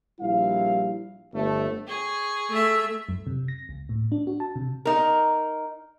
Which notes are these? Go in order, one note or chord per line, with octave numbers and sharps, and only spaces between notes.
A#1 G3 E4 F5
G1 A3
G#4 C#6
A3 E5
F#2
C3
A#6
C#2
A2
D4
F#4
A5
C3
D#4 A#4